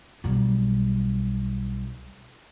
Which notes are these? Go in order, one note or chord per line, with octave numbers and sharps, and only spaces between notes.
B1 G3